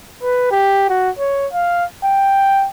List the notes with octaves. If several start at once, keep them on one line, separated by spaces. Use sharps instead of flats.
B4
G4
F#4
C#5
F5
G5